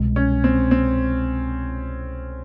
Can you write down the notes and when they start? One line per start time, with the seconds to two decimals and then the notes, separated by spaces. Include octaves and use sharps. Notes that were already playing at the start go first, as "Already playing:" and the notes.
Already playing: C2 B2 G#3
0.16 C#4
0.44 C4
0.71 C4